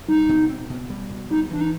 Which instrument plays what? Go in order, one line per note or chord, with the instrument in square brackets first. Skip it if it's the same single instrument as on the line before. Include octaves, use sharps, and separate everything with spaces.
[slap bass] G3 [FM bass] D#4
[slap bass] B2
C4
B2
G3
B2
[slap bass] G3 [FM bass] D#4
[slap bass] E3 [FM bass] D4
[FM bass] D#4